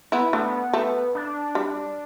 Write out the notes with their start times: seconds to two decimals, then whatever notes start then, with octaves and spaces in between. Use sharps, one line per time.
0.12 B3 E4
0.33 A3 B3 D4
0.73 A3
1.15 D4
1.55 G3